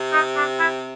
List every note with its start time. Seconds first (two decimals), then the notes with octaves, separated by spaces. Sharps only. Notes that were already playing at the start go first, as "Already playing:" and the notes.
Already playing: C3
0.13 D#4
0.36 D4
0.59 E4